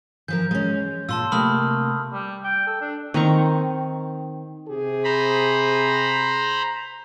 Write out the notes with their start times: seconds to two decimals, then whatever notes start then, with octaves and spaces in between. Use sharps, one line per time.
0.28 E3 F3 A#4 G6
0.51 G#3 C#4
1.09 A#2 F4 A5 C6 E6
1.32 C3 A3 A#3 B5 D#6 F6
2.13 G3
2.44 G5
2.67 A4
2.81 D4
3.14 D#3 C4 A#5 C#6
4.69 C3 G4 G#4
5.04 C5 A#5 B5